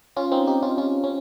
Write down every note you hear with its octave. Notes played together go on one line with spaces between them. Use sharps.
C#4 F4
C4 D#4
D#4 G4
C#4 F4
C#4 F4
C#4